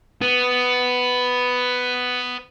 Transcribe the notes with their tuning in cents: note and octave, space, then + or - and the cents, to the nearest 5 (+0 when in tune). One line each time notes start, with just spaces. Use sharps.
B3 +10